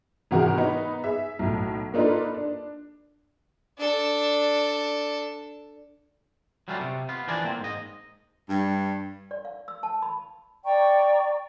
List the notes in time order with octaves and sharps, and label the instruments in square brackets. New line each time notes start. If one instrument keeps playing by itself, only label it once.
[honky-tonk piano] G#1 C3 E3 F#4 G#4 A#4
B3 D#4 B4
G#4 E5
B1 A2
A#3 D4 D#4 F4 A4 B4
D4
[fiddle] D4 A4
[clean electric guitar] F#3 G3 A3 C#4 D4 F4
C3
B3 F4
E3 F3 D4 A#4 D5 G#5
A#3 C4
G#2 D#5
[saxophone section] G2
[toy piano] D5
F5
E6
A5
B5
[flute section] D5 G5 A#5 C#6